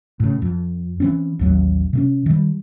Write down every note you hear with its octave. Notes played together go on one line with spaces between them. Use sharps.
A2 C#3
F2
E3 C4 C#4
A1 D#2 F#3
C3 A3 C#4
D#3 G3